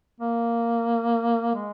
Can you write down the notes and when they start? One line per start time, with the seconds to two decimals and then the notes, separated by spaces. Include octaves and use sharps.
0.21 A#3
1.56 G#3